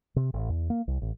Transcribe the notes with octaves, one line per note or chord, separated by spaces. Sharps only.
C3
A1
E2
A#3
C2
A1